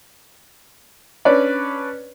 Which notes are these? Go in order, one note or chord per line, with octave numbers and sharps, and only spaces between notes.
C#4 D4 B4 C#5 D5